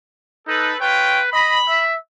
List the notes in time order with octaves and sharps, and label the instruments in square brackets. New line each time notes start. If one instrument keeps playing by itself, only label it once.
[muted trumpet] D#4 [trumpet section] A4 B4
[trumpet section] F4 C#5 G5 [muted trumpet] B4
[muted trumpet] D#5 [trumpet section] B5
[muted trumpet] E5